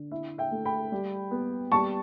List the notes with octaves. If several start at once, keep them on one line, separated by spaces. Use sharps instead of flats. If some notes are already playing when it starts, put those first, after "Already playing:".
Already playing: D3
E4 E5
E5 G5
A3
G5 B5
G3
B3
G3 A5 C#6